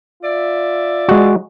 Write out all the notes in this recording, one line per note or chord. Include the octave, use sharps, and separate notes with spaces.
F4 D5 E5
G#3 F#4